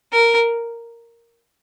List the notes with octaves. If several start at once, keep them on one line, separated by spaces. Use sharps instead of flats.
A#4